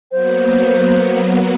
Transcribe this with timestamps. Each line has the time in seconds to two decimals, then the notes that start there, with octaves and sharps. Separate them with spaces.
0.11 F#3 A#3 B3 C5